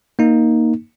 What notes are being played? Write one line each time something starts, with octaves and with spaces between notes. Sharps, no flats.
A#3 D#4